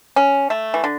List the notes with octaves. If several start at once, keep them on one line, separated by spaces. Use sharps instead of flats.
C#4
A3
E3
D3